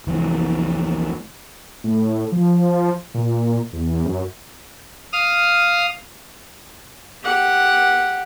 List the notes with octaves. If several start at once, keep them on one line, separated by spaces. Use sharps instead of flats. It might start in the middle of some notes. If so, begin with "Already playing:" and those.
C2 F2 E3 F3
A2
F3
A#2
E2
F#2
F5 D#6 F6
G4 F#5